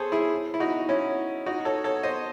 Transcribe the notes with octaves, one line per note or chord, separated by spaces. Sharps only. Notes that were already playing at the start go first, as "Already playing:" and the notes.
Already playing: G#4 A4 C5 C#5
E4 G#4
E4
D#4 F#4
C#4 E4
D#4 F#4
A4 C#5
A4 C#5
C5 D#5